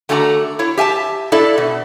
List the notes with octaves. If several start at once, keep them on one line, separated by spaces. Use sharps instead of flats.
D3 A3 D4 F#4 G#5 A#5
E4 C#5
G4 E5 G#5 A5
D4 E4 A4 D5 E5
B2